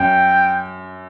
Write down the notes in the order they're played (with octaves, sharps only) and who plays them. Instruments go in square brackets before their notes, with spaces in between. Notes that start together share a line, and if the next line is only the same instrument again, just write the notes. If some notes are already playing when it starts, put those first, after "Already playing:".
Already playing: [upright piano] F#2 [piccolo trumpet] G5